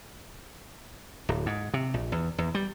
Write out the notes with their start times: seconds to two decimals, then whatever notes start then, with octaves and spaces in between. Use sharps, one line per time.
1.29 D1
1.46 G#2
1.74 C3
1.94 A#1
2.12 E2
2.38 E2
2.55 G3